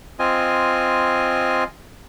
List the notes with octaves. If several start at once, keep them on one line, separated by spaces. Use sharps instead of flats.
C4 F4 D#5 G#5